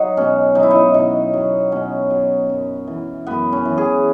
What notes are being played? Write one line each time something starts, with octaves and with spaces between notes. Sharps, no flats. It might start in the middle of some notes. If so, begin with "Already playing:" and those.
Already playing: F#3 D#4 F#4
B2 C#4
F#3 D#4
E4
D#4
B2 D#4
F#3
B2 C#4
F#3
F#2
E3
F#2 B3
C#4
E3
G#4